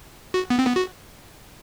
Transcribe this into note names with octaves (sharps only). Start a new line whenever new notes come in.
F#4
B3
C4
B3
F#4